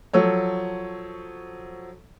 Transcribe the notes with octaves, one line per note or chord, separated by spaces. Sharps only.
F3 F#3 A4 C#5